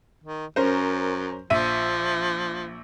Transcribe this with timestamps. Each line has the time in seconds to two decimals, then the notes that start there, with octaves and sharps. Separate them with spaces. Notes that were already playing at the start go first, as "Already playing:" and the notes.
0.24 D#3
0.56 F#2 C#4 A#4 C5
1.50 A#1 F3 E5 D#7